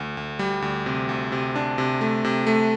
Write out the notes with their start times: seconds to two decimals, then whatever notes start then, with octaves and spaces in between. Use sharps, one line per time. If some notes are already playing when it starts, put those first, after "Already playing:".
Already playing: D2
0.17 D2
0.39 G3
0.62 D2
0.86 C3
1.09 D2
1.32 C3
1.55 D4
1.78 C3
2.01 A3
2.25 C3
2.47 A3